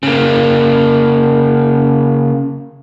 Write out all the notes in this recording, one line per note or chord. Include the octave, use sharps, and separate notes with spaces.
C#3 A#3